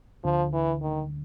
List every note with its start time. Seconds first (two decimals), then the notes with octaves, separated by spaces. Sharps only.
0.24 D2 D3 F3
0.53 E3
0.82 D#3